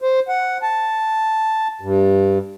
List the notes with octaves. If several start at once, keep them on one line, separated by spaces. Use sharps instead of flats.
C5
F#5
A5
G2